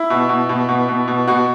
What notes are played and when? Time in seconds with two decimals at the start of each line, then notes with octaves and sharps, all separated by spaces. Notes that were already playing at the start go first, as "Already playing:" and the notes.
Already playing: E4
0.10 B2
0.29 B2
0.49 B2
0.68 B2
0.88 B2
1.08 B2
1.27 B2 F#4